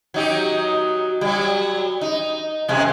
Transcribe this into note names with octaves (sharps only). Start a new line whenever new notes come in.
F#3 D#4 G4
F#3 G3
D#4
F#2 C3 G#3